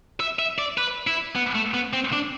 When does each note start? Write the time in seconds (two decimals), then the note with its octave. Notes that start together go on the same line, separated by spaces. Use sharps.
0.20 E5
0.39 E5
0.59 D5
0.78 B4
1.07 E4
1.36 B3
1.55 A3
1.74 B3
1.93 C4
2.13 D4